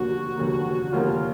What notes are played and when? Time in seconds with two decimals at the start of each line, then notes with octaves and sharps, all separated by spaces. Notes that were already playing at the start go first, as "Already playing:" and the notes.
Already playing: F1 D#2 D3 G3 A#3 F#4
0.37 F1 D#2 D3 G3 A#3
0.92 F1 D#2 D3 G3 A#3 F4